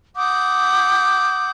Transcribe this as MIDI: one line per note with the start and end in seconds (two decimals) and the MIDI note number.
0.16 1.51 78
0.16 1.51 86
0.16 1.51 87
0.16 1.51 91